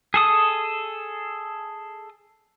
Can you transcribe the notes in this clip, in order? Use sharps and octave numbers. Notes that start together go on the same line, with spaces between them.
G#4 A4 D#6